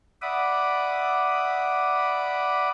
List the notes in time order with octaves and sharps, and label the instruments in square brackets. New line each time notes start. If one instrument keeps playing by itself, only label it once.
[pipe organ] D5 E5 F#5 B5 D6 D#6